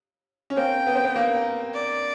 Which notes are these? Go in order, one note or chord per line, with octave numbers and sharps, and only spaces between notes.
C#4
A#3 C4 G5
B3
C4
B3
A#3
D5